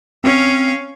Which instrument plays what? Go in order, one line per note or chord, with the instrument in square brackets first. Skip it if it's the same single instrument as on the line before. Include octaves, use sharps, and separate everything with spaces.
[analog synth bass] C4 [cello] C#4 F5